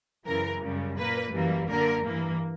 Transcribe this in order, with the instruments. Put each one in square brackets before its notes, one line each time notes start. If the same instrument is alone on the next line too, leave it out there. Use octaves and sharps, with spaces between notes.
[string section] F#2 C#3 E3 A#4
F#2 C#3 G3
A#2 A#3 B4
F#2 E3 G3 A#3
F#2 D3 A#3 A#4
G2 E3 A#3